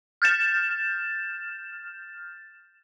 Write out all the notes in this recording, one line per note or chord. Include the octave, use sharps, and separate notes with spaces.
F6 G6 A6 E7